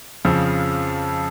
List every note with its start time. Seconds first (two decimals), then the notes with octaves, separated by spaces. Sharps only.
0.25 F2 C#3 F3